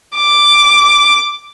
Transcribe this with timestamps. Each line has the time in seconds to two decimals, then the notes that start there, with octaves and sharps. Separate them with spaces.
0.17 D6